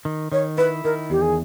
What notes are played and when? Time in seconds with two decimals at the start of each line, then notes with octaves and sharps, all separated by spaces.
0.05 D#3
0.32 D#3 C#5
0.57 E4 B4
0.84 D#3 A#4
1.10 E2 G4
1.22 G#4